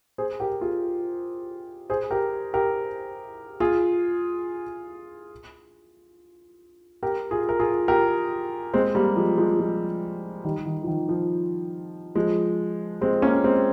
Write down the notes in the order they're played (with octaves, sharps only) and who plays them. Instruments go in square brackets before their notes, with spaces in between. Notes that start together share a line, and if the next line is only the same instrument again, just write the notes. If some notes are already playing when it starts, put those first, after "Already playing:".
[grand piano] G#4 C5
G4 A#4
F4 G#4
G#4 C5
G4 A#4
G4 A#4
F4 G#4
G4 A#4
F4 G#4
A#4
F4 G#4
G4 A#4
G#3 C4
G3 A#3
F3 G#3
F3 G#3
F3 G#3
D#3 G3
D#3
F3
D#3
F3
F3 G#3
G#3 C4
A#3 C#4
G#3 C4